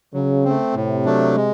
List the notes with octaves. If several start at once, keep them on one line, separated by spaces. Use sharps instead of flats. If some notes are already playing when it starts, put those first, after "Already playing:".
C#3 F#3
A3 C4
A2 C3
F#3 A3 D4
G#3